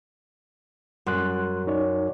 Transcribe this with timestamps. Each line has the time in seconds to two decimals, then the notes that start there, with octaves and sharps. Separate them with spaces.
1.06 F#2 G3 C6 F#6
1.67 D#4 C#5 D5